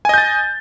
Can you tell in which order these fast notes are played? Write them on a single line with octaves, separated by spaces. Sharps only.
G#5 D#5 G6 A6